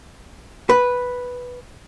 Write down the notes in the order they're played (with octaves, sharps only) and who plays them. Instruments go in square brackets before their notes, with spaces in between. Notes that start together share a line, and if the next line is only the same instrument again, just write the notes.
[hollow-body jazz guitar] B4